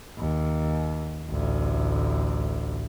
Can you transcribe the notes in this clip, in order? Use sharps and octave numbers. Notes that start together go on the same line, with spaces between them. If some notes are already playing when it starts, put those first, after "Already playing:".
D#2
A1 D2